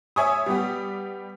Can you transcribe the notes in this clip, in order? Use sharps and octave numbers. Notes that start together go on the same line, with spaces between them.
C#5 E5 G#5 C#6 D#6
G3 B3 G4